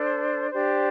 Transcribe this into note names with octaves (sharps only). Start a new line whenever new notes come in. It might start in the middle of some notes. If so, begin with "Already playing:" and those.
Already playing: D4 A4 C5
D4 G4 C5